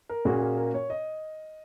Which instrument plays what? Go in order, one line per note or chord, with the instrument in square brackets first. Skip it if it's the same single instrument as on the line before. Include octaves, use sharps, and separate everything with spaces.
[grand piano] A#4
[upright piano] A#2 A#3 C#4 F#4 [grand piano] G#4
[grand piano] G#4
A#4
C#5
D#5